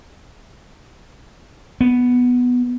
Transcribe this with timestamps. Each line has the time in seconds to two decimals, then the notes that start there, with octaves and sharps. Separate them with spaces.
1.81 B3